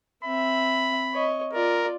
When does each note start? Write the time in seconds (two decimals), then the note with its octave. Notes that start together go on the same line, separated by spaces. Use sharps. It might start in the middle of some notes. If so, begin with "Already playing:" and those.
0.25 C4 E5 B5
1.13 C#5 D#5
1.54 F4 A#4 D5